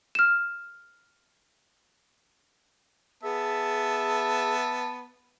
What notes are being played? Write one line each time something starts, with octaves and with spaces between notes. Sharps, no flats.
F6 E7
B3 G#4 E5 A5